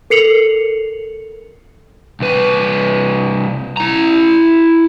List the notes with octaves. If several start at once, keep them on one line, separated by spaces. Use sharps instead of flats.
A4 A#4 C7 C#7 F7 F#7
C2 B4
E4 A#5